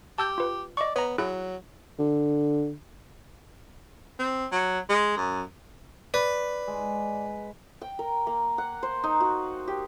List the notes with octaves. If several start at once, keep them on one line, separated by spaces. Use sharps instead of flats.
G4 A5 E6 G6
F4 B4
D5 D#5 C#6
B3 C#5 A#5
F#3 E4 G#4 F#6
D3
C4
F#3
G#3
F#2
B4 D5
G#3
G5
A#4
A#3
F#5
C5
D#4
F#4
G4